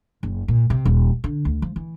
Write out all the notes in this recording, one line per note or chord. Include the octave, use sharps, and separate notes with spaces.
F#1
A#2
C3
D#1
D3
D2
F3
E3